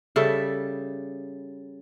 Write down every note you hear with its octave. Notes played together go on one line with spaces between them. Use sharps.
C#3 G3 A4 E5